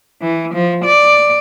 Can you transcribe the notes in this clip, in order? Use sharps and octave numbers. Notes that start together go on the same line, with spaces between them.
E3
F3
D5